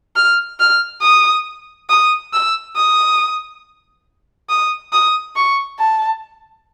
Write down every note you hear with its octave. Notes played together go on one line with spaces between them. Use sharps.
F6
F6
D#6
D#6
E6
D#6
D#6
D#6
C#6
A5